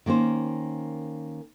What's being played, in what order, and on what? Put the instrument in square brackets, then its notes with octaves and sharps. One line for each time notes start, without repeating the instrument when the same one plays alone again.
[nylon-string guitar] D#3 A#3 C#4 C5